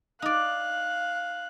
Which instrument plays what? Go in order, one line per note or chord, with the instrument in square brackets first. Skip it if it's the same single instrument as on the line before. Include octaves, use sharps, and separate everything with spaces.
[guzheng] D#4 D5 [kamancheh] F5 F#6